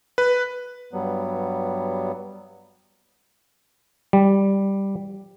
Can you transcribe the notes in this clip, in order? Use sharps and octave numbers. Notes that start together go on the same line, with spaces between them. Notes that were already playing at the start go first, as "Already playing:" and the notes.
B4
G2 F#3 G3 B3
G3